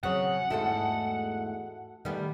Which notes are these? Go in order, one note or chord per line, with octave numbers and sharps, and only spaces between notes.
C#3 F#3 C4 C#5 F#5
E2 G#2 A3 F#4 A4
D#3 G3 A3 B3